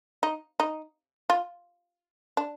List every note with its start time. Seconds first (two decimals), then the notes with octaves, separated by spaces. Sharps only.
0.23 D#4
0.60 D#4
1.30 F4
2.37 D4